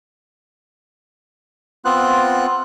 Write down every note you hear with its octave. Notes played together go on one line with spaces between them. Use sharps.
B3 C4 F4 F#6